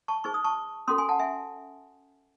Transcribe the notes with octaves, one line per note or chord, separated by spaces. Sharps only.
A5 C#6
D#4 G#4 C5 C#6
D#6
A5 C#6
C#4 F#4 A4 C6 D#6
G#5 C6
F#5 A5
E5 G#5